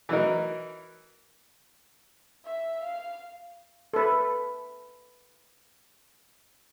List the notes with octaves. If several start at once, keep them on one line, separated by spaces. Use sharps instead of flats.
E3 F#3 D#4 A#4
E5
F5
A4 B4